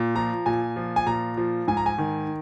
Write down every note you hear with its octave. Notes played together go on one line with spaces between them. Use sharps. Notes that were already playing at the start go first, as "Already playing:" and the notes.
Already playing: A#2
F3 A#5
A#2 G#5
F3
G#5
A#2 A#5
F3
G#2 G#5
A#5
G#5
D#3